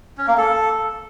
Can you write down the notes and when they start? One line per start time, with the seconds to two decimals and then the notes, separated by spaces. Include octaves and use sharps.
0.18 C#4
0.28 A#3
0.37 A4